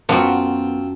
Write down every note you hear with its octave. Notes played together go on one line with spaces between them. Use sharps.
F#2 B3 C4 F4 F#4 A5